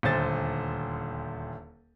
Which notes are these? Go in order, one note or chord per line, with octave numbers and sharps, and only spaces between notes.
D#1 D2 C5 A6